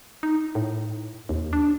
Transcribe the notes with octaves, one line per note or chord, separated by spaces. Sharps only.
D#4
A2
D#2
D4